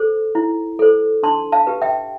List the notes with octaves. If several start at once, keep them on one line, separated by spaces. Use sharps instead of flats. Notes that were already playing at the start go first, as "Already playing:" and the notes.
Already playing: A4 C5
E4
A4 C5
D4 A5 C6
F5 A5
G4 B4
E5 G5